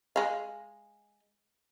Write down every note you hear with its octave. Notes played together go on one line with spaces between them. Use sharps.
G#3 F5